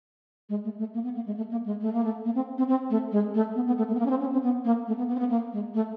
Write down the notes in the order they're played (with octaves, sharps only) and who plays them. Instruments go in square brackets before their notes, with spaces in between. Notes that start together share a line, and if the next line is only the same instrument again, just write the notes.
[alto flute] G#3
A3
A3
A#3
B3
A#3
G#3
A3
A#3
G#3
A3
A#3
A3
A#3
C4
C4
C4
A3
G#3
A3
B3
B3
A3
A3
B3
A#3
C#4
C4
C#4
C4
B3
A#3
A3
B3
B3
C4
B3
A#3
G#3
A3